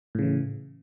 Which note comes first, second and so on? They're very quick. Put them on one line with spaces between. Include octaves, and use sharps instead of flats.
A2 C#3 E3